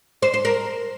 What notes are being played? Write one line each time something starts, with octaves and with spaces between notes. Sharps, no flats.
C5
C5
A#4